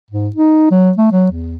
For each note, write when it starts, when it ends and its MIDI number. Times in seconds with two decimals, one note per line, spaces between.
0.10 0.29 44
0.36 0.67 63
0.71 0.91 54
0.97 1.07 57
1.12 1.31 54
1.31 1.57 40